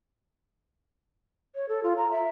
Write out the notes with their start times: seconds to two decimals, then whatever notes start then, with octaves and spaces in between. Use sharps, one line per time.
1.55 C#5
1.69 A4
1.83 F4
1.97 A#5
2.11 E5